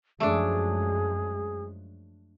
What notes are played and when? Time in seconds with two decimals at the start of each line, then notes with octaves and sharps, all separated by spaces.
0.20 F#2 F3 G#3 A3 D4 G#4